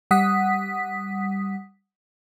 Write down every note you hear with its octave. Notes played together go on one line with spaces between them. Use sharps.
G3 F#5 D#6 B6